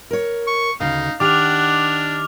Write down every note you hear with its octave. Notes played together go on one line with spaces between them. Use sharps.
A#4 C#5
C#6
D2 C#3 D#4 F5
D#3 D4 G4 F#5 D6 F6 F7